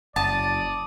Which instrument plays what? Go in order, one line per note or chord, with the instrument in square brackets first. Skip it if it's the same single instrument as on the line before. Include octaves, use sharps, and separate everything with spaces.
[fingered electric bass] F#1 [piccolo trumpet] D5 [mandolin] A5 [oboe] D#6